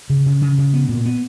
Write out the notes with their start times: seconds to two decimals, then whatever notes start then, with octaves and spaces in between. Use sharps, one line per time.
0.10 C#3
0.26 C#3
0.42 C#3
0.58 C#3
0.74 B3
0.89 A#2
1.06 B3